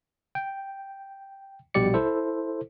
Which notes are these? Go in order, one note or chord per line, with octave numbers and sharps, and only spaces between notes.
G5
A#1 B2 G3 G4 D5 C#7
E4 A4 C5